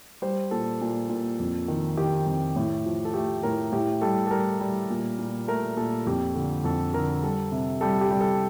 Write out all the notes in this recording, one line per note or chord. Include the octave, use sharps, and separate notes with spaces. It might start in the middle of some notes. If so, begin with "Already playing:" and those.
G3 C5
A#2 A4
A#2
A#2
F2
D#3
D#3 G4
F2
A2
F3
A4
A3 G4
A2 A#4
A2 G4
G3 A4
A4
G3 A#4
G3
A#2
A#2
A3 A#4
A#2 A4
F2 G4
D3
F2 A4
D3 A#4
G3 A4
C3
G3 A4
G4
G3
A4